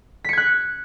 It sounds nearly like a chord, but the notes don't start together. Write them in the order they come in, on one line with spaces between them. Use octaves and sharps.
B6 C#7 G#6 F#6